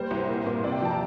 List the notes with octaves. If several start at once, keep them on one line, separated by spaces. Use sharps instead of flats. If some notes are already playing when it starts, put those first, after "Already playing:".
Already playing: G3 A#3 C5
C2
A#2
A#2
C3 D5
G5
F3 A5
A#5